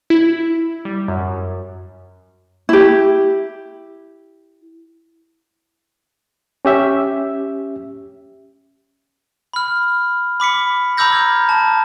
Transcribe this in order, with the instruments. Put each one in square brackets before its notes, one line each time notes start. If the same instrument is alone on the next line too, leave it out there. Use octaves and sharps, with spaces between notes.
[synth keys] E4
G3
F#2
[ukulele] E4 G4
[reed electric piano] C#4 G4 E5
[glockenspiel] B5 F6
B5 D6 B6 C#7
A#5 B5 D6 E6 G6 A#6
F6 G#6
A5